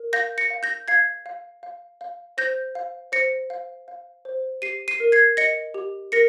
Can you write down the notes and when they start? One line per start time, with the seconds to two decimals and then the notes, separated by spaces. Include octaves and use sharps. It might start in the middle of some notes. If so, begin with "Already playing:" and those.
Already playing: A#4
0.13 F5 G6 A#6
0.38 A#6 C#7
0.50 F5
0.63 G6 A#6
0.88 F5 G#6 C7
1.26 F5
1.63 F5
2.01 F5
2.38 C5 G6 A#6
2.75 F5
3.12 C5 A#6 C#7
3.50 F5
3.88 F5
4.25 C5
4.62 G4 C7 D#7
4.88 C7 D#7
5.00 A#4
5.12 G#6 C7
5.37 D#5 A#6 C#7
5.74 G4
6.12 A#4 A#6 C#7